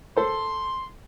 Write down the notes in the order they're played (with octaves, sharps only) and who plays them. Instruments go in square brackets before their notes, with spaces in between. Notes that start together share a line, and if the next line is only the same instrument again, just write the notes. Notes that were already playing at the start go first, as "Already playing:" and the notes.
[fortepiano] A4 C5 [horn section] C6